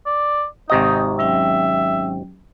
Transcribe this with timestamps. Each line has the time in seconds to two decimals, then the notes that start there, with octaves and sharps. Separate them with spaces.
0.06 D5
0.70 G#1 C3 D#4 D#5 A#5 C#6 D#6
1.19 F#3 C#4 E5 G5